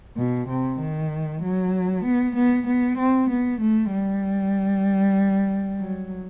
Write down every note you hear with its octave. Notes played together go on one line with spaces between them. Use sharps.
B2
C3
D#3
F#3
B3
B3
B3
C4
B3
A3
G3
F#3